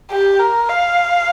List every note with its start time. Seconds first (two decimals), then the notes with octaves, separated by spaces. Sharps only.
0.11 G4
0.39 A#4
0.69 F5